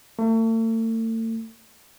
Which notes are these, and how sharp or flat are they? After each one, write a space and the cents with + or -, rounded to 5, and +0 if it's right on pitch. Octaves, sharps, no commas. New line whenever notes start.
A3 +40